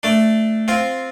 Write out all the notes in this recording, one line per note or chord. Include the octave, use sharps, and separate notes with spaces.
A3 D4
C4 F4